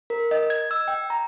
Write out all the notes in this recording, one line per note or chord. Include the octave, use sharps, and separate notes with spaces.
A#4
D#5
G#6
E6
G5
A#5